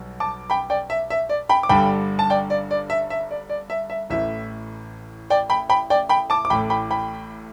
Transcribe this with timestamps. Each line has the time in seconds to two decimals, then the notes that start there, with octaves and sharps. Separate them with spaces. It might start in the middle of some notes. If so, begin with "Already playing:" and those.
Already playing: B1 B2 G3
0.20 A5 D6
0.50 G5 B5
0.70 D5 G5
0.90 E5
1.10 E5
1.29 D5
1.49 G5 B5
1.63 D6
1.69 G1 G2 D3 G3 G5 B5
2.19 A5
2.30 D5 G5
2.50 D5
2.71 D5
2.90 E5
3.10 E5
3.31 D5
3.49 D5
3.70 E5
3.90 E5
4.10 A1 A2 E3 E5
5.30 D5 G5
5.50 G5 B5
5.69 G5 B5
5.90 D5 G5
6.09 G5 B5
6.30 A5 D6
6.45 D6
6.50 A1 A2 A3 G5 B5
6.70 G5 B5
6.91 G5 B5